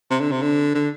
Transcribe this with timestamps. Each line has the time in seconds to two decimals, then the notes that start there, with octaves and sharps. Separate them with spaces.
0.11 C3
0.20 D3
0.31 C3
0.42 D3
0.75 D3